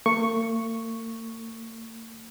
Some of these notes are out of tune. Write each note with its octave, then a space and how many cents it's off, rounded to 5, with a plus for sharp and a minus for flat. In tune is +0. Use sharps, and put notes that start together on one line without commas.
A#3 -45 C#6 +0